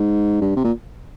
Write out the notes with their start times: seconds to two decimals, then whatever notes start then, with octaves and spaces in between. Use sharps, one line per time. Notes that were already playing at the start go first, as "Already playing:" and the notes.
Already playing: G#2
0.42 G2
0.57 C3
0.64 A#2